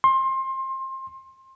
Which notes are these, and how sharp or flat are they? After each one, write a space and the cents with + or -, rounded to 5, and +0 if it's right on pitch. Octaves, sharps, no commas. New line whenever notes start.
C6 +25